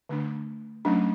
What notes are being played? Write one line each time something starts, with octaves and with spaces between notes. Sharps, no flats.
D3 A3 D4
F#3 A3 C#4 D4